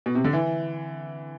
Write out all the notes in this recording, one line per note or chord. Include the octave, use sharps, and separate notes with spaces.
B2
C3
D3
E3